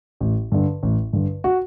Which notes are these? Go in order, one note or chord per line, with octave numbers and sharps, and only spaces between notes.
A1
G2 D3
A1
G2 D3
F#4